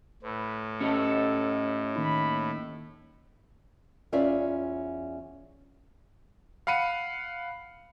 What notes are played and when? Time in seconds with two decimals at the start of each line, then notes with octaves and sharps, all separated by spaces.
0.22 A2 B4
0.81 C#4 G4 A4 D#5
1.96 D#3 A#3 D#4 B5
4.12 E2 C#4 F4 D5 E5
6.67 F5 F#5 B5 C#7 D#7